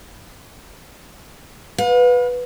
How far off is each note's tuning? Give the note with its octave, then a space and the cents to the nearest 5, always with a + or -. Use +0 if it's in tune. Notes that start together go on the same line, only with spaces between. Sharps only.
B4 +0 F5 +45